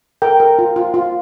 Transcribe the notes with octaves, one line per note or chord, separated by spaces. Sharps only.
A#4 G5
A#4
F4
F4
F4